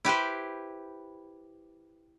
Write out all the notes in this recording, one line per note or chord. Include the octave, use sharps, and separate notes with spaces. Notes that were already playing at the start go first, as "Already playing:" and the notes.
E4 G4 B4 C5